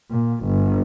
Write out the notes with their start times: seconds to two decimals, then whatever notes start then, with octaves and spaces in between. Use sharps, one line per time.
0.11 A#2
0.45 G1